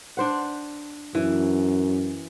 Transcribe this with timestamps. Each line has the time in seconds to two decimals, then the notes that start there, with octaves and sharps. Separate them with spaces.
0.17 D4 C5 F#5
1.15 F#2 E3